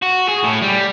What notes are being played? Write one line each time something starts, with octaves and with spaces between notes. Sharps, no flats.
F#4
G#4
A2
G3